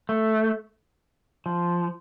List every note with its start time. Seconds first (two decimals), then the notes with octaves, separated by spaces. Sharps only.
0.09 A3
1.46 F3